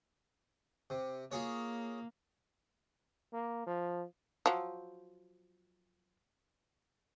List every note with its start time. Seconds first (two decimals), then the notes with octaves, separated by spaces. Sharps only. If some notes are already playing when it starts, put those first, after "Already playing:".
0.90 C3
1.31 A#3 F4 G#4 C#5
3.33 A#3
3.67 F3
4.46 F3 F#3